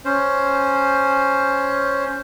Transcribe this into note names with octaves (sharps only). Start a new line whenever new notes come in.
C#4 C5